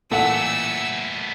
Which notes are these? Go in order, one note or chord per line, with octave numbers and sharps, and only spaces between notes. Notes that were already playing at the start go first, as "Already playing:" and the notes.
A1 A#2 A3 B3 A4 F#5 E6